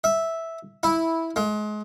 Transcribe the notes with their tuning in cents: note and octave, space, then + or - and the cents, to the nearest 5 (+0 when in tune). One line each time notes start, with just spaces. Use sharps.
E5 -5
E4 -10
G#3 +30